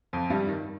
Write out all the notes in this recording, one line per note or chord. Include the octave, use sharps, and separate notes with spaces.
F2 F3
G2 G3
D#3